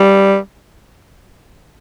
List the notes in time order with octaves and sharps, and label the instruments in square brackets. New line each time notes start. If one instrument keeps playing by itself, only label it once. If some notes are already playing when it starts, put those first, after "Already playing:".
Already playing: [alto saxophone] G3